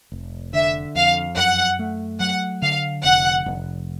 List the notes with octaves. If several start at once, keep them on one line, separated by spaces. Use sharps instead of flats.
F1
D3 E5
F2 F5
F#2 F#5
A3
F#3 F#5
D3 F5
F1 F#5
F1